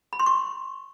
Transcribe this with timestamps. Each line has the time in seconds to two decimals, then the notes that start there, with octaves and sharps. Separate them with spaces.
0.13 B5
0.19 C6
0.26 C#6